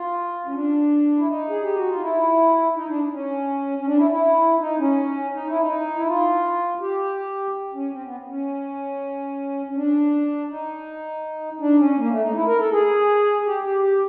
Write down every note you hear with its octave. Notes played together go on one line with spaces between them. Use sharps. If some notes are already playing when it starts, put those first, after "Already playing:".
Already playing: F4
C#4
D4
E4
D#4
G#4
G4
F#4
F4
E4
D#4
D4
C#4
C#4
D4
E4
E4
D#4
C#4
D#4
E4
D#4
E4
F4
G4
C#4
C4
B3
C#4
C#4
D4
D#4
D4
C#4
A#3
A3
D#4
E4
A#4
A4
G#4
G4
G4
G4